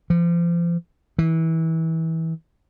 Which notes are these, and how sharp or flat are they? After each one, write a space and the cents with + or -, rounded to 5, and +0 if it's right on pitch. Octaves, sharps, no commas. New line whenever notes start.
F3 -35
E3 -25